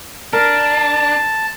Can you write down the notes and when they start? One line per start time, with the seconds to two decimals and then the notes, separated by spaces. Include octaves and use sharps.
0.33 D4 A#4 A5